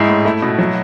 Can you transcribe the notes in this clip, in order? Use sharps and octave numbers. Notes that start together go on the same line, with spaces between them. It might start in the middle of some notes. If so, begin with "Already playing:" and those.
Already playing: G#2 G#3 E4
A2
A3 E4
B2
F#3